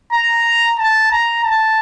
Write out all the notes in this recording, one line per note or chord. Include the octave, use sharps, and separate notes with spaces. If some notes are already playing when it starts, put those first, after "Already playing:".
A#5
A5
A#5
A5